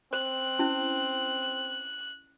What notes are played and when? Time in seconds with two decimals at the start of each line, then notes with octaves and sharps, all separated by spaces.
0.13 C4 C5 F#6
0.59 C#4 E4